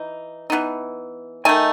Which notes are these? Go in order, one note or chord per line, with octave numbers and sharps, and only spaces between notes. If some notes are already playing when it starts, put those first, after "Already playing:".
Already playing: E3 D#4
E3 B3 D#4
D#3 A3 D#4 G#5